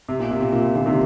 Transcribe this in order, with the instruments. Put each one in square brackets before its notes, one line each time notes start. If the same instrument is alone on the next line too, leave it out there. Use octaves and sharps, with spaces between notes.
[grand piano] C3
A#2
C3
A#2
A#2
A#2
A#2 D3
C3 D#3